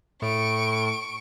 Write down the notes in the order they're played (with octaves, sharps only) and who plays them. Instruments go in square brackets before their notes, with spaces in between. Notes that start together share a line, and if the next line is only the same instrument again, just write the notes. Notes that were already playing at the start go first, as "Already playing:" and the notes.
[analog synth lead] A2 [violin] C#6 D7